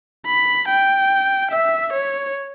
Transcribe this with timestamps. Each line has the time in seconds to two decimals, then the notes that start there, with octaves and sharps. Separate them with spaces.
0.27 B5
0.69 G5
1.51 E5
1.93 C#5